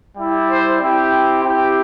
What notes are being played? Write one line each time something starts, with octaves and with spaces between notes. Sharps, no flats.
G3 E4 G4
C5
C4 E4 G4
C4 E4 G4